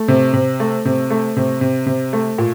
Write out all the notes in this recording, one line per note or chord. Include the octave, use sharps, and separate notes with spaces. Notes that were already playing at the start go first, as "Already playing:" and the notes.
Already playing: A3
C3
C3
A3
C3
A3
C3
C3
C3
A3
A#2